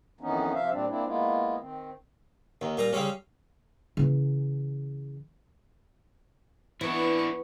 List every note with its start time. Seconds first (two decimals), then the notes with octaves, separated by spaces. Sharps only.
0.21 F2 D#3 E3 B3 C#4 D#4
0.54 C3 F3 E5 F5
0.71 A#2 G3 C4 D4
0.89 A#3 C4 D4 E4
1.05 G#3 A#3 B3 E4 F4
1.59 D#3 C4
2.61 D#2 D#3
2.78 A#2 G3 A#5
2.93 C#3 G3 C4 C#4
3.97 C#3 E3
6.81 E3 B3 D4 E4 C#6